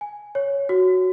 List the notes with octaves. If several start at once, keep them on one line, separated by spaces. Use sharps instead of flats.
G#5
C#5
F#4